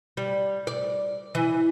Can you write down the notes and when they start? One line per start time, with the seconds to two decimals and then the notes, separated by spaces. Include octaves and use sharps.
0.17 G3
0.67 D5
1.35 E3